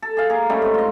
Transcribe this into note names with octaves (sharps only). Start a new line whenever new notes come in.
A4
G#4 F5
A#3 G#4 A#5
G3 A3 C#4 D#4
G#2 C4
F4 D#5